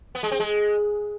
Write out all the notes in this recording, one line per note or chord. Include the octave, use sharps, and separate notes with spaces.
B3
G#3
C4
G#3